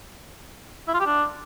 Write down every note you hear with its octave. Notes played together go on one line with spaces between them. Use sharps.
E4
F4
G4
D4